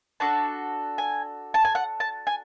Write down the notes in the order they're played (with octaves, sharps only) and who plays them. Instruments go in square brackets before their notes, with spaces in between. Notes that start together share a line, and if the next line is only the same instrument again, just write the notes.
[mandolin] D4 F#4 A4 A5
G#5
A5
G#5
F#5
A5
G#5